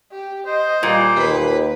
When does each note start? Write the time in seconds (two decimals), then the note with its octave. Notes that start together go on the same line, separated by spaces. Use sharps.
0.11 G4
0.46 C5 D#5
0.83 A#2 G3
1.16 D#2 B4